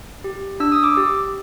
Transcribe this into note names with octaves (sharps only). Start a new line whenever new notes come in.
G4
D4 E6
D#6
D6 E6
G4